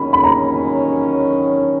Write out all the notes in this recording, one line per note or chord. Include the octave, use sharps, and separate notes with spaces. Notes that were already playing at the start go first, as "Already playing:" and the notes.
Already playing: D#3 F#3 C#4 B5
B5
A#5